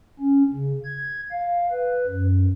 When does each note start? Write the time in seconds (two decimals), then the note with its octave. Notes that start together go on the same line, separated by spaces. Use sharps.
0.20 C#4
0.53 C#3
0.85 G#6
1.32 F5
1.71 B4
2.07 F#2